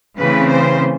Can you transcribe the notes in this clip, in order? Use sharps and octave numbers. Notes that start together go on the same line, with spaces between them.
C#3 E3 A3 C4 B4
C5